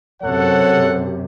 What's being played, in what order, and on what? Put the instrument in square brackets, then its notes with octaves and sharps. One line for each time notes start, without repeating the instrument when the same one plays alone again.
[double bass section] F#2 C3 [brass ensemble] A4 C#5 F#5